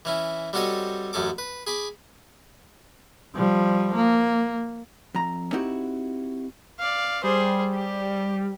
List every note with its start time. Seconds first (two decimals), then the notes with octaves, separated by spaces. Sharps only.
0.05 E3 C#4 E4
0.53 G3 C4 F#4 A4 C#5 D#5
1.13 A1 F#2 C#4 A4 D6
1.38 B4
1.67 G#4 B5 D6
3.36 F3 G3
3.95 A#3
5.15 F2 A#5
5.53 C4 D#4 E4 F#4 G4
6.79 D5 F5
7.24 G3 G#4 C5
7.74 G4